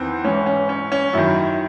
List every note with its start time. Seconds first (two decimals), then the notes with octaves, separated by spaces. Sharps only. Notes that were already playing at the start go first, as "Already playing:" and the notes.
Already playing: E2 D#3 C4
0.24 G#2 E3 C#4
0.46 C#4
0.69 C#4
0.92 C#4
1.13 F#2 D#3 E4